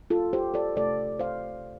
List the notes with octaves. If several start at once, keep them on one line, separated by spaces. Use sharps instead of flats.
F4 A4
G4 C5
A4 D5
C3 A3 A4 D5
C5 F5